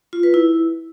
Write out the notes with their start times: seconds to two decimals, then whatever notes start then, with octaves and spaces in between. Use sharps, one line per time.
0.13 F4
0.23 B4
0.34 E4